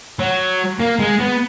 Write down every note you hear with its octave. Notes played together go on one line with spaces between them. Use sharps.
F#3
A#3
G#3
B3